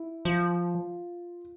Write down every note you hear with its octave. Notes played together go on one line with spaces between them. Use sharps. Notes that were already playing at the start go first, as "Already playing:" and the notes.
Already playing: E4
F3 F4